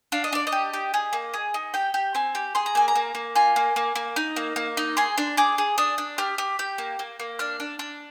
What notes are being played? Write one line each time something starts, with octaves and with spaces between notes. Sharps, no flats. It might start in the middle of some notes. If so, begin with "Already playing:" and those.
D4 F5
D#5
D4 D5
D#5
G4
G4
G#4
A#3
G#4
D#4
G4 G5
G4
C4 G#5
G4
G#4 C6
A#5
A#3 G#5
A#5
A#3
A#3
F4 G#5
A#3
A#3
A#3
D#4
A#3
A#3
D#4
G#4 C6
D4
G#4 D6
G#4
D4 D#6
D4
G4 F6
G4
G4 G6
A#3
A#3
A#3
D4 F6
D4
D4